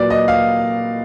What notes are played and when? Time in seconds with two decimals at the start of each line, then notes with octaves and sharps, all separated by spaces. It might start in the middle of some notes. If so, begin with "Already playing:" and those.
Already playing: A#2 F#3 B4 D5
0.10 D#5
0.28 F5